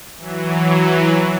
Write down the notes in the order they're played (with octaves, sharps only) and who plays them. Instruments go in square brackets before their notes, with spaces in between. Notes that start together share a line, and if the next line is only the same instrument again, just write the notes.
[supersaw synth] E3 F#3